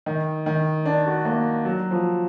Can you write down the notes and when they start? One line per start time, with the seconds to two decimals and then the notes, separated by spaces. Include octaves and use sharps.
0.06 D#3
0.46 D#3
0.86 D4
1.06 F#4
1.25 A#3
1.65 F#3
1.91 F3